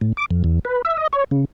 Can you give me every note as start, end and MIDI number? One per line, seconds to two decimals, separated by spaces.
0.01 0.13 45
0.17 0.26 86
0.31 0.42 41
0.44 0.59 40
0.65 0.82 71
0.85 0.97 76
0.97 1.07 75
1.13 1.24 73
1.31 1.45 49